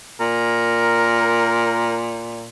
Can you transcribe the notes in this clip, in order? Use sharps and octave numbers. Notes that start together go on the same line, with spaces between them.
A#2 A#4